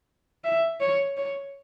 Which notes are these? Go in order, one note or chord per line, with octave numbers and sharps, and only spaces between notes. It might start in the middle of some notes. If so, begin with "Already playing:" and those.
E5
C#5
C#5